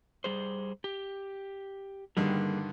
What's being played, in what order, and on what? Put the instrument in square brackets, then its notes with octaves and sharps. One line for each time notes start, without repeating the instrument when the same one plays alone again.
[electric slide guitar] G3 G#4 C5
G4
[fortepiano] G2 D3 D#3 [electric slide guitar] G3 A#3 G#4